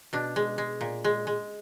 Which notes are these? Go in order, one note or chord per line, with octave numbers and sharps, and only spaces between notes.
B2 D4
G#3
G#3
A#2
G#3
G#3